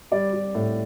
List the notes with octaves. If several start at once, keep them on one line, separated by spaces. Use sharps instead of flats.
G3 D5
G3
A2